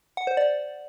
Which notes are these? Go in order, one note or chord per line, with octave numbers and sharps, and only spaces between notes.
F#5
C5
D5